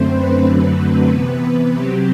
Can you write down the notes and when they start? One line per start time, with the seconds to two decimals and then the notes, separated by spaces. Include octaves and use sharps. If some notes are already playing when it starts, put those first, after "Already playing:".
Already playing: F#2 D3 A3 C4 C5
0.12 B4
0.44 F#2 D3 F#3 A3 C4
1.09 C3 E3 B3
1.72 C3 F#3 C4 G4